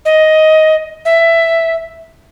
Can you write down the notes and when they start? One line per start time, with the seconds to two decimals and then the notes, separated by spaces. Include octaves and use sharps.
0.05 D#5
1.05 E5